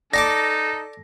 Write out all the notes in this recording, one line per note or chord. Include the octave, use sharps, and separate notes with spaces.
D#4 A4 D5 A5 D6 A#6